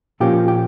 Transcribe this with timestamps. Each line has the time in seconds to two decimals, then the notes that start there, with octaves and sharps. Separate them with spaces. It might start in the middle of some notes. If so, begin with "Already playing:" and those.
0.20 A#2 F3 A#3 C#4 F4 G4
0.48 G4